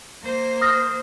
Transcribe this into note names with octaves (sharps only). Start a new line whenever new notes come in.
A#3 C5
D#6 F6 A#6